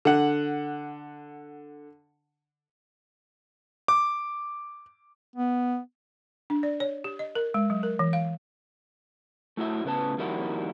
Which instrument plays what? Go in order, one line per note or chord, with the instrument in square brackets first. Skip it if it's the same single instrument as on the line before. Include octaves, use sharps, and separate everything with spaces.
[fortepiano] D3 F#5
[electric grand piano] D6
[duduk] B3
[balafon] D4
D5
C#5
G4
D#5
A#4
G#3
F#3
A#4
E3
F5
[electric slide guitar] A3 E4 F#4 E5
A2 C#3 B3 B4 A5
F2 D#3 G3 A#3 E4 F#4